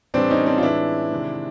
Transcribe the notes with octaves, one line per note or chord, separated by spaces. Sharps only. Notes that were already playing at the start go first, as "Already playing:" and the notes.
A2 E3 G3 C4 D4
C#4 D#4
C4 D4
F4
A2 E3 G#3 D4 E4
C3 D#3 G#3